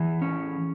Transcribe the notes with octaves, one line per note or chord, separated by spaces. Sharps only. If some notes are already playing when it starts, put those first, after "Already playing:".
Already playing: E3 G#4
C#4